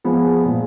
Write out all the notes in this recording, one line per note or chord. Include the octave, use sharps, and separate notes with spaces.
F3 G#3 B3
A#2 G#3